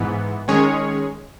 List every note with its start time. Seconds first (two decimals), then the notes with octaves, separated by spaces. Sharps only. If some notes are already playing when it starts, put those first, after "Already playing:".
Already playing: G#2 E3 B3
0.48 D#3 G#3 C#4 G#4 C#5